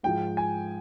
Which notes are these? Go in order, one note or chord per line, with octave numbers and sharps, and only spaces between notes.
G#2 F3 G#3 G5
G#5